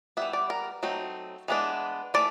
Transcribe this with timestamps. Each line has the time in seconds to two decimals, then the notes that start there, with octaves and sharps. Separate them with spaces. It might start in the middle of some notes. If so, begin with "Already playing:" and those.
0.17 E3 G3 B3 E5
0.33 D5
0.50 A#4
0.83 F#3 A3 C4 D#4
1.48 E3 G#3 B3 D4
2.14 E3 A3 D5